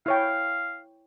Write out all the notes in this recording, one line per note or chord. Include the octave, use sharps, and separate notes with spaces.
E4 C#5 F5 G5